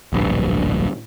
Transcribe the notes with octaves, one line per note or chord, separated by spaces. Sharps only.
D1 A#1 G2